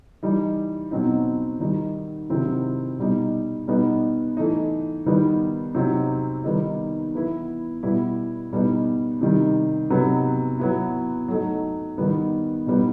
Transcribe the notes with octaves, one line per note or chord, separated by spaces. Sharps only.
E3 G3 D#4
B2 F#3 C4 D#4
D#3 G3 D#4
C3 D#3 F#3 C4 E4
B2 G3 D#4
B2 G3 B3 D#4
E3 A3 D#4
D#3 G3 B3 D#4
C3 F#3 C4 D#4
D#3 G3 B3 D#4
E3 B3 E4
B2 G3 B3 E4
B2 G3 B3 D#4
C3 D#3 G3
C3 F#3 B3 D#4
F#3 B3 E4
F#3 A3 D#4
D#3 G3 B3
B2 G3 B3 D#4